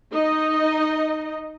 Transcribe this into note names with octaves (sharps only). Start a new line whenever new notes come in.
D#4 D#5